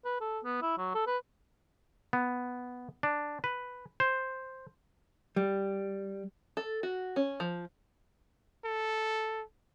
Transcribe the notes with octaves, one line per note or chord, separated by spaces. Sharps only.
B4
A4
B3
E4
F#3
A4
B4
B3
D4
B4
C5
G3
A4
F#4
C#4
F3
A4